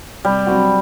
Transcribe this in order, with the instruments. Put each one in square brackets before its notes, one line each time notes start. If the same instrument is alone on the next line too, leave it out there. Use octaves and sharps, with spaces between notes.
[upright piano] C3 [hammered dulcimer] G3
[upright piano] F#3 C4 F#4